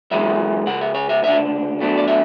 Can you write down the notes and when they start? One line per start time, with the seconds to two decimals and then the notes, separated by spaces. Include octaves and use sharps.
0.11 F#2 E3 G#3 E5
0.66 C#2 C#3 F#5
0.81 E5
0.95 C#5
1.09 E5
1.23 D2 C#3 D4 E5
1.79 B1 B2 A3 D4
1.98 D5
2.08 E5